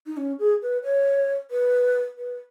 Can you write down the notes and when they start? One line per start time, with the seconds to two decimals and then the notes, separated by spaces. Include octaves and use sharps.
0.07 D#4
0.17 C#4
0.39 G#4
0.62 B4
0.84 C#5
1.51 B4
2.18 B4